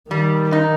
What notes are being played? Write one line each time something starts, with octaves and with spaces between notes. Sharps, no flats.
D#3 G3
D#4